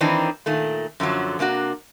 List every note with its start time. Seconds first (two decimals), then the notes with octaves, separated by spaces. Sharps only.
0.01 D#3 E3 C4 D4 D#4
0.46 A#2 D#3 A3
1.00 F#2 D3 F3 F#3
1.39 C3 A#3 D4 F#4